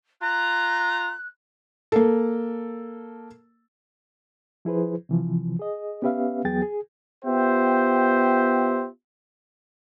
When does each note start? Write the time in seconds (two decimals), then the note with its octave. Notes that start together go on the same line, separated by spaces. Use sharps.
0.22 F4 A#5 F#6
1.92 A#3 A4
4.65 F3 E4 G#4 B4 C5
5.09 C3 E3 F3
5.59 G#4 D#5
6.02 B3 C#4 G4 B4 E5 F5
6.45 E2 F#3 B3 G#4 G5 A6
6.62 G#4
7.25 B3 F4 G4 C5 E5 G5